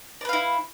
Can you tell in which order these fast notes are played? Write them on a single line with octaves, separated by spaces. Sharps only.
D5 B4 F5 E4